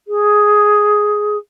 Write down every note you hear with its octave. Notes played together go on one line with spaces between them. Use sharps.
G#4